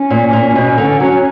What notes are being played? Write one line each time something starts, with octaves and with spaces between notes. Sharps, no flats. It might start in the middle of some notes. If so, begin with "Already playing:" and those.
Already playing: C#4
A#2
A#2
B2
D3
F#3